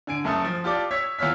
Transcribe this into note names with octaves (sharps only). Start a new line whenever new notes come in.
D3 G#5 D7
F#1 F#2 A3 A4 D#6
F3
F4 G4 A4 D5 D6
C#5 E6 G#6 B6
E2 F4 C#5 E6 F6 B6